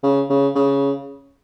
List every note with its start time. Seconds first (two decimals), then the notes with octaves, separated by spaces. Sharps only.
0.03 C#3
0.30 C#3
0.55 C#3